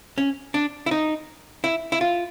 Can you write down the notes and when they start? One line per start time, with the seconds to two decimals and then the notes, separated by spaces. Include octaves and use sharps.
0.18 C#4
0.54 D4
0.86 E4
0.91 D#4
1.64 E4
1.92 E4
2.01 F4